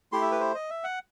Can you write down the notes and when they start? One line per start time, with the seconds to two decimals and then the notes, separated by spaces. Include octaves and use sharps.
0.12 A3 E4 G4 C6
0.22 E5
0.31 B4
0.40 C5
0.55 D#5
0.70 E5
0.84 F#5